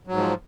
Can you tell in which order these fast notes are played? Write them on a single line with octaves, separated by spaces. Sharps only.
F#3 G#2 F3